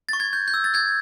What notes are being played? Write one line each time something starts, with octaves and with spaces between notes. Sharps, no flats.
C#6 A6
G#6
G6
G6
E6
A6
G6 G#6